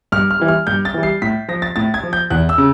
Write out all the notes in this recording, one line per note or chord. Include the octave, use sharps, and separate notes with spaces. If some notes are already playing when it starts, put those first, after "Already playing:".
G2 F6
F6
E3 G3
F6
G2 G6
A6
E3 G3
C7
A2 B6
F3 A#6
A6
A2 A6
G#6
F3
G6
E2 F#6
E6
C#3